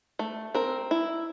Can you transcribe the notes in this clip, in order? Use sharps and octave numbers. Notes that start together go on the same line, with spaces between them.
A3
C4 A#4
E4